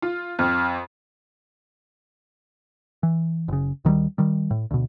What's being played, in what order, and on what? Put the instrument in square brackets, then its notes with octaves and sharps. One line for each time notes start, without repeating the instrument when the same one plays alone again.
[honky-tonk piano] F4
[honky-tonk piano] F2 [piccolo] F6
[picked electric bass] E3
F#1 C#3
D2 D#3 F#3 G3
D#3 G3
A2
D2 B2